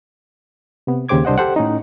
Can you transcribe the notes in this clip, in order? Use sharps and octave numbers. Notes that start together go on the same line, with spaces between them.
C3 B3
D#2 C#3 G4 C5 D6 G#6
C2 D4 C5 D#5 F#5
G4 A4 C5 F#5
A2 C#4 D#4